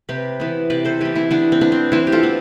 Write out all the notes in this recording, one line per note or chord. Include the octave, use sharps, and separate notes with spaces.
C3 G4 B4
E3 B3
C3 B4 D5
A4 C5
E3 B3 G4 B4
C4 E4
E3 B3 D4
C4
B3 D4
C4
E3 C4 E4
G4
F4 A4
B3